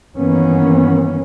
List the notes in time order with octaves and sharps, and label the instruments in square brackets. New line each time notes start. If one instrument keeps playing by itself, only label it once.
[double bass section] G2 D#3 E3 A#3 B3 C#4